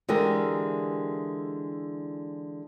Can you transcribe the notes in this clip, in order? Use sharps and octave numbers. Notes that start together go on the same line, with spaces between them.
D3 E3 G#3 G4 G#4 A#4